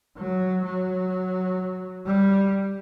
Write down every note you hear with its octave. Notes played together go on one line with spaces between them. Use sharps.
F#3
F#3
G3